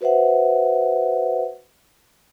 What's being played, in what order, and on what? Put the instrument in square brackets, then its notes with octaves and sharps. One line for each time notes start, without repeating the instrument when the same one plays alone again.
[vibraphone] F#4 B4 C5 E5 F#5